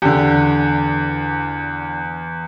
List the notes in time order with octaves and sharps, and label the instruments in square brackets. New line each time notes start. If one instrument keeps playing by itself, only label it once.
[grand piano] E2 [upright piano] D3 G4